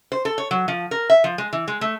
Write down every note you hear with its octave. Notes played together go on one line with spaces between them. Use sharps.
C5
A4
C#5
F#3
F3
A#4
E5
F3
G#3
E3
G#3
A3